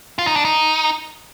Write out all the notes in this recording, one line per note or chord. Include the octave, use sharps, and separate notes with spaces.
F4
D#4
D4
D#4